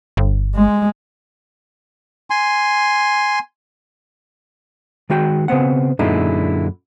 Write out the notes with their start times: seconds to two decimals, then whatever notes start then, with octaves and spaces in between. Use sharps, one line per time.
0.17 G1
0.55 G#3
2.30 G#5 C6
5.10 D#3 G#3 F#4 G5
5.48 C#3 B3 C4 F#5
5.99 F#2 A#2 D3 G#3 D#4 E4